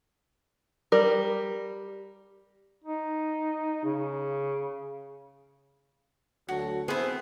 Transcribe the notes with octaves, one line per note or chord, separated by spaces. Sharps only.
G3 A#4
D#4
C#3
D2 F#3 F#4 A4
B3 C4 E4 G#4 C5